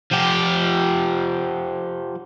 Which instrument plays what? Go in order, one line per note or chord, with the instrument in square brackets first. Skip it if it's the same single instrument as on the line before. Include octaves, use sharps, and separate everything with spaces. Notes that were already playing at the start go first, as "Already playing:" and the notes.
[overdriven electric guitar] F3 G4